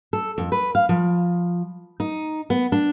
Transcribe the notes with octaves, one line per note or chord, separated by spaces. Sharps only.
A4
F2
B4
F5
F3
D#4
B3
D4